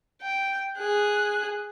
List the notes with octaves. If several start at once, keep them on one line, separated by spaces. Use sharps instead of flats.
G5
G#4 F#6